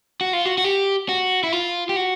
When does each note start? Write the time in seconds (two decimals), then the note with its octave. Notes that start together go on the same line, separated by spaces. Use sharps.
0.21 F#4
0.33 F4
0.45 F#4
0.58 F#4
0.64 G4
1.09 F#4
1.44 E4
1.52 F4
1.89 G4
1.96 F#4